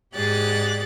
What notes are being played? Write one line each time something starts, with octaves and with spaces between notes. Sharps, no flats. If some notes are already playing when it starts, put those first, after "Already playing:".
G#2 G4 G#4 D5 F#6 A6